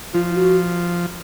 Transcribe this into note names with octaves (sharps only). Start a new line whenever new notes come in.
F3 F4
F4
F#4